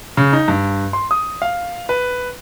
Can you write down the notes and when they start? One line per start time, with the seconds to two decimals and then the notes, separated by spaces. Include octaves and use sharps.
0.17 C#3
0.33 D#4
0.48 G2
0.93 C6
1.11 D#6
1.42 F5
1.89 B4